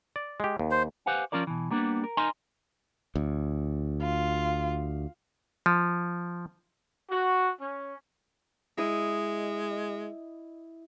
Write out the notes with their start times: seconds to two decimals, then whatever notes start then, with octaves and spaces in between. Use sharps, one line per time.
0.16 D5
0.40 G#3 G4
0.59 D#2
0.71 C5
1.06 G4 B4 C5 F5 F#5 G#5
1.32 F3 C#4 F4 A#4 D5
1.47 B2 E3
1.71 G3 A#3 B3 D4
2.04 A#4
2.17 D#4 A#4 D#5 G#5 A#5 C6
3.15 D2
4.02 F4
5.66 F3
7.10 F#4
7.60 C#4
8.78 G#3 E4 D#5